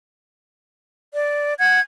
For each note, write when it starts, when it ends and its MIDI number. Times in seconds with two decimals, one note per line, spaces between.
1.15 1.53 74
1.59 1.80 78
1.59 1.80 92